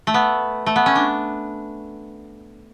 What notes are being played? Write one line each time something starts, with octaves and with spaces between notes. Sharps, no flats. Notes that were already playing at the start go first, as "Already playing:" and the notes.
A3
B3
A3
B3
C#4
D4